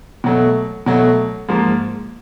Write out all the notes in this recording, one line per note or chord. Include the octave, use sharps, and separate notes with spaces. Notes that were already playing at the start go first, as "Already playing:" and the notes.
B2 F#3 A3
B2 F#3 A3
G#2 F3 A#3